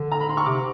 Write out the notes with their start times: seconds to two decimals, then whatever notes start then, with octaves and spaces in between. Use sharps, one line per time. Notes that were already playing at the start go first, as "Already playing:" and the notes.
Already playing: D3
0.12 A#5
0.20 B5
0.29 C6
0.37 C#6
0.46 C3 D6